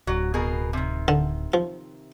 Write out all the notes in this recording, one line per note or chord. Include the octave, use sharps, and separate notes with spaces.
D1 F#3
B2 G#4 A#4
C3 D#3
D3
F3